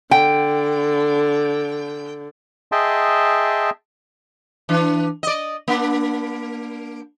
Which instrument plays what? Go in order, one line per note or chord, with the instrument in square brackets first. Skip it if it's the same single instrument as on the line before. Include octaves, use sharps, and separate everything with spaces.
[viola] D3 [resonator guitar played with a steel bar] G5
[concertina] G#4 D#5 E5 G5 A5 C6
[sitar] E3 D4
D5 D#5
A#3 D4